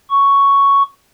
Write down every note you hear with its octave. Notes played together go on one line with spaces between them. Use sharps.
C#6